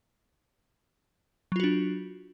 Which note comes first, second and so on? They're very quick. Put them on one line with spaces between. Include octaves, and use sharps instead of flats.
F#3 F4 F#4 D4